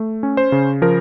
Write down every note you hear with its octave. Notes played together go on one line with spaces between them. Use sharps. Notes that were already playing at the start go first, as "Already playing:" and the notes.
Already playing: A3
C#4
C5
C#3
F3 A#4